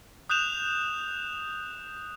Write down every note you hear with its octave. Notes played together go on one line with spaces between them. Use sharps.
D#6 F#6 G6 E7 F7